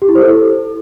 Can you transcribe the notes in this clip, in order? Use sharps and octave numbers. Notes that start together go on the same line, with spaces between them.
G4
E4
C5
A4